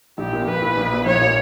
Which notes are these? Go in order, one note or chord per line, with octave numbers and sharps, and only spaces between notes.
A#1 G4
A#2 A#3
A#1 B4
A#2 A#3
A#1
A#2 A#3
A#1 C#5
A#2 A#3